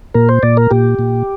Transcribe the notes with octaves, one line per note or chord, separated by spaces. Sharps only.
A#2 A#4
C5
A#2 D5
A#4
A#2 G4
A#2